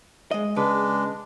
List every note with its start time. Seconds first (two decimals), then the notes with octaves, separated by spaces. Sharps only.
0.31 G#3 D#5
0.56 C#3 G#3 D4 B4